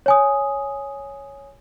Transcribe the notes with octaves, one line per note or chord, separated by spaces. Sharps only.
C#5 G#5 D#6